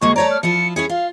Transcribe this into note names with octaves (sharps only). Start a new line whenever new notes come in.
D2 G#3 A#3 C#6
A3 C#5 D5 A#5
F6
F3 E4 F4 C#7
C#4 E4 G#4 C#7
F4 F5